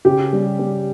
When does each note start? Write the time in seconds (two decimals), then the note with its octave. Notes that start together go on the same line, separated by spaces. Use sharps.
0.05 C#3 G4
0.33 G3
0.59 G3